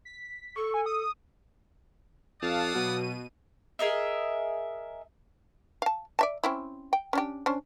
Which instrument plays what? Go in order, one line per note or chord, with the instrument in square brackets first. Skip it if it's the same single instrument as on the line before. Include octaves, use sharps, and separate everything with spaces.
[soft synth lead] B6
[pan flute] A4 [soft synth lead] C#6
[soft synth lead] G#5
D#6
[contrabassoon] F2 [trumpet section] D5 F#5 D#6 [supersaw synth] F5 A5
[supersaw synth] B2 D#7 [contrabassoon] F#3
[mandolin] G#4 A#4 D#5 E5
[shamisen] F5 A5
D5 E5 A5
C4 C#4 E4
G5
C#4 D4 G4
C#4 D4 C5